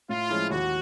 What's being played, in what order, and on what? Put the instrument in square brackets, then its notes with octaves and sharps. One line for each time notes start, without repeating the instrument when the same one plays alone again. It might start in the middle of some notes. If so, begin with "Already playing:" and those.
[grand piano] A2 [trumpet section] F4
[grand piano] F3 G#3 C#4 E4
[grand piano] D#2 [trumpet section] F#4